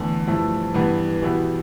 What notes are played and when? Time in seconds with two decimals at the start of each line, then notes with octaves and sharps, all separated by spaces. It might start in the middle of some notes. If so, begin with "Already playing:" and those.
Already playing: E2 D3 A3
0.27 G2 F3 A3 C4 E4
0.74 G2 E3 B3
1.22 E2 B2 B3 E4 G4